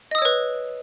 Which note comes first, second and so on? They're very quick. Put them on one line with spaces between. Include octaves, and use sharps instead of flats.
D#5 D#6 E6 C#5 B4